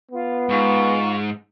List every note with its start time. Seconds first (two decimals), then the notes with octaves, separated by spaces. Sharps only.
0.11 B3 F4
0.49 G#2 F4 C#6